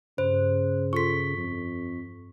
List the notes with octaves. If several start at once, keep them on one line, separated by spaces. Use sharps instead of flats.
G2 C#3 C5
F4 A4 C6 C#6 B6
F2